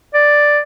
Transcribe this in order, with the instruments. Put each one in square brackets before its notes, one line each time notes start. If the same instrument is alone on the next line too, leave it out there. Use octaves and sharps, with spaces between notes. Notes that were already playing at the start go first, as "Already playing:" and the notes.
[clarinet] D5